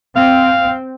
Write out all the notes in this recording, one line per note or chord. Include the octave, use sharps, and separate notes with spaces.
C4 F5